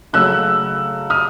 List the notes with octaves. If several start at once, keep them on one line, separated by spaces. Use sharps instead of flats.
C#3 F#3 A3 E6 F#6
D#6 F6